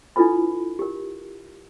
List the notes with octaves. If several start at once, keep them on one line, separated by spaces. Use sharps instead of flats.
D4 E4 F4 A4 B4 B5
G4 A#4